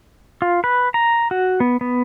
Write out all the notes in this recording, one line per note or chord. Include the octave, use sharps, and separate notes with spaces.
F4
B4
A#5
F#4
B3
B3